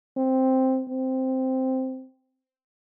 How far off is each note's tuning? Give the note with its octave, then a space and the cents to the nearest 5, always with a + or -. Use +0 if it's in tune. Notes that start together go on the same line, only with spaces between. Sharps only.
C4 +0
C4 -5